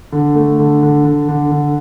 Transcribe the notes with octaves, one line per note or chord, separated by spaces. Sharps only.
D3
A3
D3
D3
D3
D3
D3